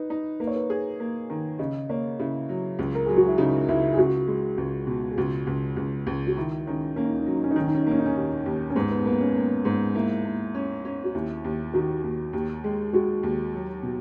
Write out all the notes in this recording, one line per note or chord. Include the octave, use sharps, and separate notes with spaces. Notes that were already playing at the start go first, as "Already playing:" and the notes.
Already playing: D#4 B4
D#4
A#3 B4
C#5
B4
G#4
A#3
D#3
C#3 D#5
A#3 C#5
C#3 E4
F#3
C#2
A#4
F#3 G#4
F#4
E4
C#3 D#4
C#2 E4
G#4
C#2 F#4
G#3
C#2
B2
G#4
C#2 F#4
C#2
C#2
C#2
F#4
D#3 E4
D#3 C#4
A#3 C#4
D#4
C#4
D#4
F#3 C#4
D#4
C#4
D#4
D#3 C#4
D#4
C#4
D#4
A#3 C#4
D#4
C#4
D#2
D#2
C#4
G#2 B3
B3
A#3 B3
C#4
A#3
G#2
A#3 E4
A#3
C#4
C#4
F#4
D#2 E4
D#2
D#3 F#4
D#2
D#2
G#3
G#3 F#4
D#2
F#3
B2